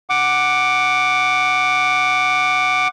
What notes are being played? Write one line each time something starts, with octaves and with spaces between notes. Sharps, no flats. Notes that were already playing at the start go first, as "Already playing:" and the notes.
F#5 D6